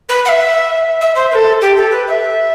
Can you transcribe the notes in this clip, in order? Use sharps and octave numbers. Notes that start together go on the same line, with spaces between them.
B4
F#5
E5
E5
C5
B4
A4
G4
A4
B4
E5